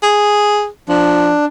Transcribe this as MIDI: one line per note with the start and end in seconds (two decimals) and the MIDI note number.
0.03 0.68 68
0.89 1.34 53
0.89 1.45 62